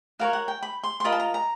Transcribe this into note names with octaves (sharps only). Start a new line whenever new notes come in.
F#4 A#4 C#5 F5
F#5
G5
B5
C6
C6
F4 A#4 D#5 B5
A5
A#5
A#5